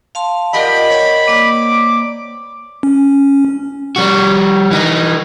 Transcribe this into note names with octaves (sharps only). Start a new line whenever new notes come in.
F5 A5 C6
F4 G4 A#4 D5 D#5 F#5 B5
C4 C#5
A#3 D5 D6
C#4
G3 F#4
E3 D#4